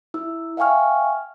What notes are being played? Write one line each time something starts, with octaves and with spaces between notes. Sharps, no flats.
E4 E6
E5 F5 G5 G#5 C#6 F6